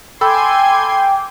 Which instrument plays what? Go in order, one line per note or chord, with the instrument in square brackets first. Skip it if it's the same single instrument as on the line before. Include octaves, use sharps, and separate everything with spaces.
[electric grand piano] A4 B5 E6 [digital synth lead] G5 [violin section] G#5 C6 G#6 [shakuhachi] D6